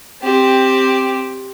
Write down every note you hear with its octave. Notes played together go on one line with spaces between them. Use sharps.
C4 G4